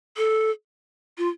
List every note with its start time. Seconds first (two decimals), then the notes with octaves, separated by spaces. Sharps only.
0.17 A4
1.18 F4